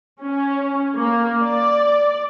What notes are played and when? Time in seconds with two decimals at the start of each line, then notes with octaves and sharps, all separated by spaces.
0.22 C#4
0.96 A#3
1.42 D5